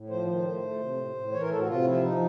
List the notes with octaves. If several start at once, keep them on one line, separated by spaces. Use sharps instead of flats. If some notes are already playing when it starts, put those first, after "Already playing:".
Already playing: A2
F3 C5
D#3 C5
A3
A3
C3
A2
A2
E3 C#5
A#4
A2 A4
F#4
C3 F4
F3 E4
F3 D#4